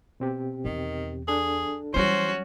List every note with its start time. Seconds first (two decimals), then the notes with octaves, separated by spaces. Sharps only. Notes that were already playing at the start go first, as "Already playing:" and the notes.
0.20 B2 C4 G4
0.65 E2 D#3
1.28 D4 G#4 A4
1.94 E3 F#3 G3 C#4 F#4 C5